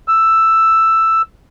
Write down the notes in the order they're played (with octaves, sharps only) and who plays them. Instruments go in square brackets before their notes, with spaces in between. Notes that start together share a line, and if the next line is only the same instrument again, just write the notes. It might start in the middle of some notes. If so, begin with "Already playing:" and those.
[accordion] E6